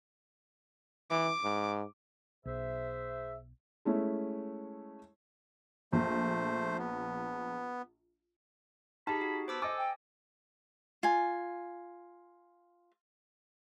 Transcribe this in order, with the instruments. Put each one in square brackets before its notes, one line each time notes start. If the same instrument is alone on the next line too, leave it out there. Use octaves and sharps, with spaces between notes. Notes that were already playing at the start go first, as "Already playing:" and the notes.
[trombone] E3 [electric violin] D6
[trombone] G#2
[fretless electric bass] B1 [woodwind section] G#4 C5 E5
[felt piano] G#3 A3 C#4 E4
[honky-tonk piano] A#1 [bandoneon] A3 C5
[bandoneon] B3
[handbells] D#4 G4 G#4 [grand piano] A5 [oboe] B5
[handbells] F#4
[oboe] B3 [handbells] C5 D6 E6
[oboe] A4 [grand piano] D#5 D6 [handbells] G#5
[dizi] G5
[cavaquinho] F4 G#5